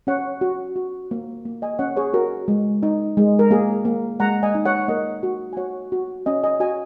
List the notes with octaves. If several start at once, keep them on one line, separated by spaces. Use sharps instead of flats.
C#4 C#5 F#5
F#4
F#4
A#3
A#3
D#5 G#5
C#4 C#5 F#5
G#4 C#5
F#4 A#4
G#3
D#4
G#3
A#4
A#3 G#4
A#3
G#3 F#5 A#5
D#5 G#5
D#4
C#5 F#5
A#3 A#4 D#5
F#4
G#5
F#4 C#5 F#5
F#4
C#4 D#5 G#5
D#5 G#5
F#4 D#5 G#5